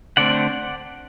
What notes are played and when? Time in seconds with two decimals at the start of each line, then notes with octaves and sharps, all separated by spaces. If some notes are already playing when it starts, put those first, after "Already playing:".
0.17 D3 A3 C4 D5 F#5